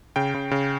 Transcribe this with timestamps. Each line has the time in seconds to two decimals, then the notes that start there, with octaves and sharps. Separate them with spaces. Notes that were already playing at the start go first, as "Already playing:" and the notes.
0.16 C#3 G5
0.34 C#3
0.51 C#3